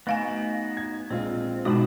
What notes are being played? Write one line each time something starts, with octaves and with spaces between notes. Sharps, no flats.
A3 B3 D#4 F#4 F5 G#5
G#6
A#1 G#3 C4 F4
G#2 B2 G#3 C4 F#4 A5 B5 D#6